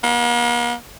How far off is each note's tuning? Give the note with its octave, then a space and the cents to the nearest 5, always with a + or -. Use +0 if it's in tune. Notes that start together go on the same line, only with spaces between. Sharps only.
A#3 +45